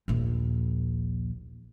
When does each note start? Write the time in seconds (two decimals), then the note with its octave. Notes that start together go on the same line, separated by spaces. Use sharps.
0.08 A#1 D#2